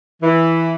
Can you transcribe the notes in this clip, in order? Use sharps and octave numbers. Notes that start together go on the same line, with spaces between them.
E3